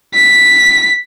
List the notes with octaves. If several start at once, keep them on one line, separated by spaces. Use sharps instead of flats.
B6